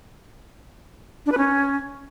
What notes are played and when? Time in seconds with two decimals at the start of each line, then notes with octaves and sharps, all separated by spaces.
1.26 D4
1.32 B4
1.38 C#4